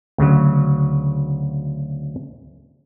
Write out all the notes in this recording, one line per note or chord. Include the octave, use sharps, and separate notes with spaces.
D2 C#3 F#3